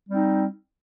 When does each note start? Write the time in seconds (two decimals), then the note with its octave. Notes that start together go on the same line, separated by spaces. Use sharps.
0.08 G3
0.11 C4
0.14 D#4